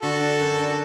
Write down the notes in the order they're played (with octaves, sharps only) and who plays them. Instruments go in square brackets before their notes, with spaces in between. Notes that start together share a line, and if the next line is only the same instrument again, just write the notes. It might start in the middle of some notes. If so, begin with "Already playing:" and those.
[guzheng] D3 [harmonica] F#4 A4
[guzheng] D4
F#2
D4